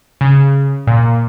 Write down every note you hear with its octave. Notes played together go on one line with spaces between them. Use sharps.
C#3
A#2